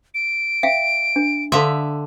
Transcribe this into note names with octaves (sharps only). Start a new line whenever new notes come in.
D7
E5 F5 G5
D4
D3 A4 E5 F5 C6